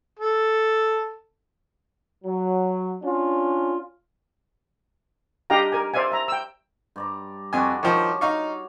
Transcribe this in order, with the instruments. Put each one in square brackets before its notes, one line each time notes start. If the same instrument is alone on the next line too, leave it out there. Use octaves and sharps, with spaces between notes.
[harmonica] A4
[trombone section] F#3
C#4 D4 F4
[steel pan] D4 G4 D#5 F5 G5 A#5
A#4 G#5
C5 D5 E5 F5 G#5
E5 A#5
G5 E6
[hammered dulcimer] G2 D5 A#5
[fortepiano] F2 G#5 [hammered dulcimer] D4 F4 F#4
[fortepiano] D#3 F3 [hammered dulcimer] C#5 D5
[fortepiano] D#4 F5 C#6